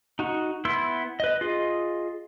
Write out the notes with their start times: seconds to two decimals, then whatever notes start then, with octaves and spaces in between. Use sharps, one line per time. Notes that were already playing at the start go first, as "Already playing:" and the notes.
0.19 D#4 F#4
0.65 B3 E4 C6 E6
1.20 B4 D#5
1.41 F4 G#4 D#5